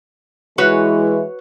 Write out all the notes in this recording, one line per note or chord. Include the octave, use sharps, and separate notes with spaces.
E3 G#3 E4 F#4 B4 C#5